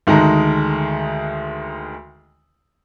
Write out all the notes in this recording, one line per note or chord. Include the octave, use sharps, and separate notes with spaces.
D2 D#3 G#3 D#4 A4 A#5